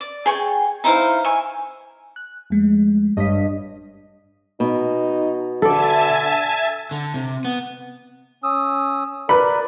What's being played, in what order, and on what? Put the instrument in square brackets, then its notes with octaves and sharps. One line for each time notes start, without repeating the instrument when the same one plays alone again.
[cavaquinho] D5
G#4 G5 G#5 C#6
D#4 E4 C5 F5
E5 G#5 C#6
[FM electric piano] F#6
F2 G#3 A3
[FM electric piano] G#1 C#5 B6 [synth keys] G2 D#5
[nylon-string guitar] B2 [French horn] D#4
[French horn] D3 [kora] A4 D5 [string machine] E5 G#5 A5
[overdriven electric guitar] D3
C3
B3
[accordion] C#4 D#6 E6
[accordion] A#4 D5 [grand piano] B4 B5